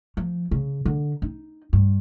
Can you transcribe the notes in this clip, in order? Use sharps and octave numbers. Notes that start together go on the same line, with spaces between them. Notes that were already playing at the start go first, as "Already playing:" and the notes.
F3
C#3
D3
D#4
G2